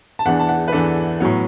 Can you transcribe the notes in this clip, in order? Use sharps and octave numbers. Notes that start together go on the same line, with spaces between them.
A5
E2 E3 B3 D4 F#5
A5
F#5
B4
E2 E3 B3 D4 A4
A2 F#3 B3